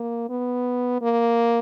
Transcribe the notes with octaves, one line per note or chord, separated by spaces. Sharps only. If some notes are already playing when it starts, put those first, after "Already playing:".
Already playing: A#3
B3
A#3